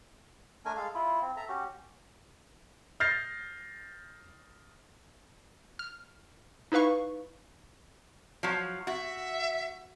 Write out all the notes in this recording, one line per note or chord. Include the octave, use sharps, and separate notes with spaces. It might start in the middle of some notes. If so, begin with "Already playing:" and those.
A3 D4 A#4 G#5
G#3 A4 F5
E4 F4
C4
A4 E5 A#5
C#4 F#4 G4
F6 G6 A6 A#6 C7
F6
D#4 E4 B4 F5 C#6
F3 F#3
F#4 E5